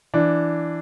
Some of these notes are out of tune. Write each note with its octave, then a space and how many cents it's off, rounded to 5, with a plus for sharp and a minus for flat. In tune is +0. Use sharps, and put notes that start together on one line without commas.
E3 +10 D4 +0